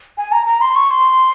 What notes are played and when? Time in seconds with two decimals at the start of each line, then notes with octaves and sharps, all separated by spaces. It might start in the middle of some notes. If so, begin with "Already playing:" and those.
0.18 G#5
0.32 A#5
0.47 A#5
0.61 C6
0.76 C#6
0.91 C6